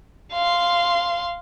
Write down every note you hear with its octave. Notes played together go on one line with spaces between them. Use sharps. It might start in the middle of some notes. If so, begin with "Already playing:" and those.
F5 C6